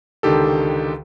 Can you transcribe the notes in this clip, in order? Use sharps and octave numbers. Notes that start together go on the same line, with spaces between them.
C#2 D3 D#3 G4 A4